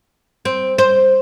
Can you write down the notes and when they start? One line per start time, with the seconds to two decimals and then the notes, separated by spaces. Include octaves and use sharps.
0.45 C4
0.78 C5